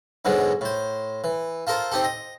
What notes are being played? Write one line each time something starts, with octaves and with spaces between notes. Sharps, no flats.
G#2 B2 D3 F#3 G#3
A2 C5
E3
F4 A4 A#4 C5
C4 D#4 G4 A4
D#5